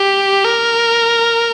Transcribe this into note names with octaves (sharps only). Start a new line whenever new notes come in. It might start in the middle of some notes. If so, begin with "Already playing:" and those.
Already playing: G4
A#4